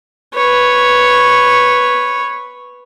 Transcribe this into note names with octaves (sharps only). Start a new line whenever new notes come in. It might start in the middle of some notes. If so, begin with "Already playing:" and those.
B4 C#5